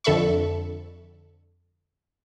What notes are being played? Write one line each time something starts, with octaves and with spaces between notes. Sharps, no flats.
F2 D3 A4 E5 B5 C#6